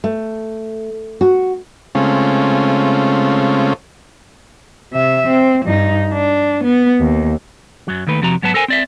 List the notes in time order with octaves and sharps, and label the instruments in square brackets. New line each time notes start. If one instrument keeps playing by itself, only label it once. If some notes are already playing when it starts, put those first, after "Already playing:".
[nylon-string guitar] A3
F#4
[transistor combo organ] C#3 G#3 A3 C4 C#4 F4
[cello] C3 E5
C4
G2 D#4
D4
B3
D#2
[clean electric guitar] F#2 F#3
D#2 D#3 A3 B4
F2 C3 F3 F#4 A#5
G#2 F#3 B3 B4 A5
A4 A#4 C5 G#5
C4 D5 E5